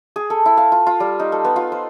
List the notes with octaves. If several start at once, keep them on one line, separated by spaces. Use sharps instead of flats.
G#4
A4
E4
F5
F4
F4
G3
D#4
A4
B3
F4
C5